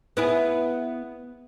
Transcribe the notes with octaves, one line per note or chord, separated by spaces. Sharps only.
B3 E4 G#4